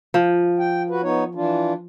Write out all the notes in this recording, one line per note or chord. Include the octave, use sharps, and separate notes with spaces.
F3
G5
F#4 B4
B3 D#4 C#5
E3 D4 F4